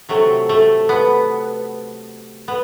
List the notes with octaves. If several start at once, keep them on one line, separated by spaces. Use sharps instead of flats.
C3 F#3 A3
A3
B3
B3